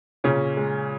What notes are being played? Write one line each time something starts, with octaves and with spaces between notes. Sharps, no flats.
A#2 C#3 C#4
G#3